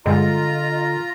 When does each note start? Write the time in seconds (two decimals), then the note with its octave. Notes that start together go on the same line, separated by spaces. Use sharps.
0.06 G2 D3 G#3 F4 D#5 A#5